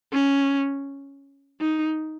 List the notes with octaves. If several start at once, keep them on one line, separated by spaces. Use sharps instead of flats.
C#4
D#4